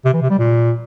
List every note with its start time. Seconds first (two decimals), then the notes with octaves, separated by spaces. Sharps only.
0.05 C3
0.13 E3
0.22 C3
0.30 G3
0.39 A#2